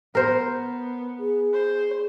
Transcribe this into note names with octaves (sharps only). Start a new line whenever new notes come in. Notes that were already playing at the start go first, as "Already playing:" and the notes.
B3 A#4 C5
G#4
C5